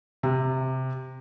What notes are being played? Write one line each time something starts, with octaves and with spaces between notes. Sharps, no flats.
C3